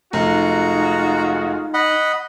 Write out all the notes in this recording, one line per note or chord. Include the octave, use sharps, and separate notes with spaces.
F1 G#3 D#4 F4 F#4 A#5
D#5 F#5 B5